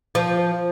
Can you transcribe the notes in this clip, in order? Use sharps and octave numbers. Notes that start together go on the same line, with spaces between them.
F3